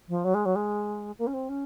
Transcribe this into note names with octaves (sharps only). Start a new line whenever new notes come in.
F3
F#3
G#3
F#3
G#3
A#3
C#4
C4
C#4